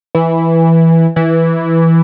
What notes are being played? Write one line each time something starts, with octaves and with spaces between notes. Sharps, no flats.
E3
E3